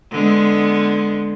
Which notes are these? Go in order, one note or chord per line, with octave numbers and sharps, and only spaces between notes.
D3 G#3 B3